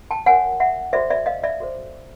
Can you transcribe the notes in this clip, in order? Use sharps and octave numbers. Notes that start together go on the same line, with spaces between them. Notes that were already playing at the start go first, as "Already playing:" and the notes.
G5 A5
F#4 A#4 C#5 F#5 G#5
E5 F#5
F#4 A4 C5 D5 E5
D5 E5
D#5 F5
D5 E5
F#4 A4 C5